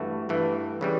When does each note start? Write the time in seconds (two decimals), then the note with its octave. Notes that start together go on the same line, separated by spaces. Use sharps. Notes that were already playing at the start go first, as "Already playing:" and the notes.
Already playing: G2 E3 A3 F#4
0.29 G2 E3 A3
0.81 C#3 E3 G3